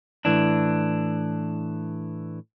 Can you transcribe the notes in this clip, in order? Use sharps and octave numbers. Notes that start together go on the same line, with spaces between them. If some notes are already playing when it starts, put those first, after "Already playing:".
A2 E3 D4